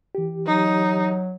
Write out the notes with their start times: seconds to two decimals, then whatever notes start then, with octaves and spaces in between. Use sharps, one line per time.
0.15 E3 G4
0.46 F#3 D#4